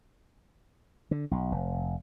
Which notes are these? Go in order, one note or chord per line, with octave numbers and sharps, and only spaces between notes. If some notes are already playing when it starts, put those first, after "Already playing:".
D3
B1
F1